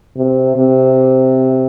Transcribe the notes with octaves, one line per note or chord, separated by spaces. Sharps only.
C3
C3